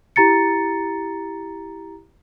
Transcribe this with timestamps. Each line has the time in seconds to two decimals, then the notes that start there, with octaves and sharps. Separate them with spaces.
0.16 E4 G4 A#5 A6 C#7